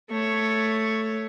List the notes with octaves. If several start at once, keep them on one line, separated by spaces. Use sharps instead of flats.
A3 C#5